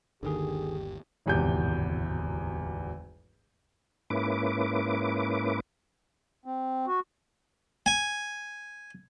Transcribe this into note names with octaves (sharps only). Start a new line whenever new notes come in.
G1 D#2 D3 D#3 G4 G#4
D1 G#1 E2 C3 G6
G#2 A#3 C#4 E4 B4 D6
C4
F#4
G#5